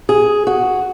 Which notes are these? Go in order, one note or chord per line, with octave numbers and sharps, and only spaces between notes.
G#4
F#4